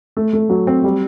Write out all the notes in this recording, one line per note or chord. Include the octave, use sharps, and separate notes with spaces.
A3
A3
F#3
C4
G3